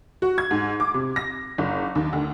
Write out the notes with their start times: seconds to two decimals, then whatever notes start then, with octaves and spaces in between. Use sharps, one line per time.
0.22 F#4
0.38 G#6
0.51 G#2
0.80 D6
0.94 C3
1.16 A#6
1.58 F#1
1.95 D#2
2.13 D2